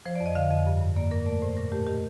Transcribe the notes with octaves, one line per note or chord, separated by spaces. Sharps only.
F3 C5
D5
F2
D#5
D3 F5
F2 D#5
G2
G2
A#3 D5
A#2 A#4
A3 D5
A2 C5
A#2 A#4
A3 G4
D#3 G4